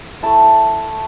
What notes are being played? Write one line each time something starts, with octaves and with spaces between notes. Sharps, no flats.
A3 E4 A5